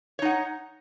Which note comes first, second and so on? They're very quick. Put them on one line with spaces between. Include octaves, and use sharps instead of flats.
C#5 D#4 F#5